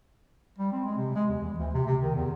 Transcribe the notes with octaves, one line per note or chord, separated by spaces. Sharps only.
G3
C4
G#3
C3
G#3
E2
E3
D2
C3
C3
D#3
E2